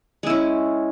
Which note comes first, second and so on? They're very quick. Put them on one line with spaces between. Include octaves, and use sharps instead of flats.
G#3 E4 C#4